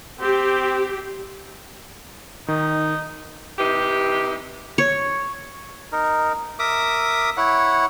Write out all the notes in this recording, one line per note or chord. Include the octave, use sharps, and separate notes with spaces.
C4 G4
D#3 D#4
C3 E3 D#4 G4
C#5
D#4 A#4
A#4 E5 D6 D#6
E4 C#5 F#5